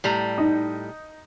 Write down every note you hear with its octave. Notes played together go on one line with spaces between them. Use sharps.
A2 G3 A#5
D#4